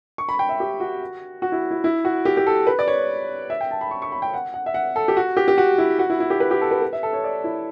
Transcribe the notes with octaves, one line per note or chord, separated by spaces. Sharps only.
C#6
B5
G5
E5
G4
F#4
F#4
E4
E4
E4
F#4
G4
G4
A4
B4
D5
C#5
E5
G5
A5
B5
C#6
C#6
B5
G5
F#5
F#5
E5
F#5
A4
G4
F#4
G4
G4
F#4
E4
F#4
E4
E4
G4
B4
G4
A4
B4
B4
E5
A4
C#5
D5
E4